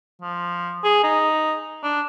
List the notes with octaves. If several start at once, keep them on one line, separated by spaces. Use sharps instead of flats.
F3
G#4
D#4
D4